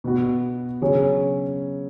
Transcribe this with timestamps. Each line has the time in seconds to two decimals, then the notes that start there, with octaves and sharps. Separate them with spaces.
0.04 B2 B3 F#4
0.81 C#3 F#3 C#4 G#4